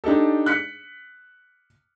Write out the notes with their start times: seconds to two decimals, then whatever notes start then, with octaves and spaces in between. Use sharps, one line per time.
0.04 D4 D#4 G4 A4
0.46 F#6 B6 C#7